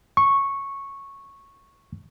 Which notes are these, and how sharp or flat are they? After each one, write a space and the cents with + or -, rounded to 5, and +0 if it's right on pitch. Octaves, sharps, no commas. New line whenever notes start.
C#6 -10